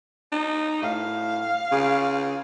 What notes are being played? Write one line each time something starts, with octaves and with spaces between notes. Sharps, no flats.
D#4
A2 F5
C#3